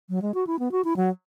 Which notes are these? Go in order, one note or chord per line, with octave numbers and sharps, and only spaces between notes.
F#3
G#3
F#4
E4
B3
F#4
E4
F#3